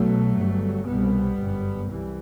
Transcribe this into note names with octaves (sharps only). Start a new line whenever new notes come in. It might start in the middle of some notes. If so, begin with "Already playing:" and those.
Already playing: B1 B2 F#3 A3
G1 G2
C2 B2 G3 B3
G1 F#2
C2 E3 G3